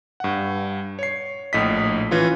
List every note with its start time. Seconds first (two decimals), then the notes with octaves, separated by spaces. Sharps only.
0.20 G2 F#5
0.99 C#5 C7
1.53 A#1 A2 D#5 B6
2.11 E3 C#4 F4